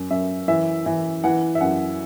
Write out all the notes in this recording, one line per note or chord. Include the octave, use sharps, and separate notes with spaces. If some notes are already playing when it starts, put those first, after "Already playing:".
Already playing: F#2
F#2 E5
E3 E5
E3 E5
E3 F#5
E5
F#2 F#5